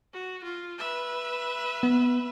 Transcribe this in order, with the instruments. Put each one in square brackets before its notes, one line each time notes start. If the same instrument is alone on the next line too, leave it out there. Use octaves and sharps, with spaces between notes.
[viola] F#4
F4
B4 E5
[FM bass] B3